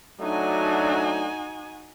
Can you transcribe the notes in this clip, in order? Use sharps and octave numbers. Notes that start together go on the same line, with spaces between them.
F#3 A3 D4 D#4 F#4 G#5